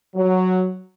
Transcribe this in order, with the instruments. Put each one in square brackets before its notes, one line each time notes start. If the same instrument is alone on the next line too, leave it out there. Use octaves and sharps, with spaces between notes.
[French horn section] F#3